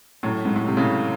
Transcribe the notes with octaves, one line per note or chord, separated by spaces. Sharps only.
F#2 A2
G#2
A2
C3
A2 C#3